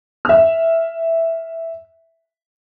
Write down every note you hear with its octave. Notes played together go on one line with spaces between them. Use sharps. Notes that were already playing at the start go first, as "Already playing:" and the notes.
E5 F6